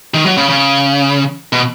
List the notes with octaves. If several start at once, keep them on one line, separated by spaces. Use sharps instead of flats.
D#3
F#3
C#3
C#3
B2